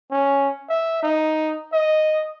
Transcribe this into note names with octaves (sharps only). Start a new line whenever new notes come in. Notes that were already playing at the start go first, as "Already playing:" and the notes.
C#4
E5
D#4
D#5